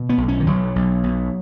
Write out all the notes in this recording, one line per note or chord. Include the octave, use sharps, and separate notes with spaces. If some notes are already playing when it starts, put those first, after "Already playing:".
Already playing: B2
B3
B1
C#4
D#3
B1 F#3
B1
B1